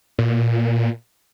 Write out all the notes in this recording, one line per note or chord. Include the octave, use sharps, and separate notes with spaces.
A#2